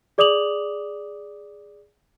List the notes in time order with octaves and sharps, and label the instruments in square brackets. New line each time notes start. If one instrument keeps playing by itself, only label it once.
[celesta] G#4 D5 D6 D#6 F7 F#7